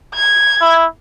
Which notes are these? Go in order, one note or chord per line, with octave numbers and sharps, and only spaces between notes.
G#6
E4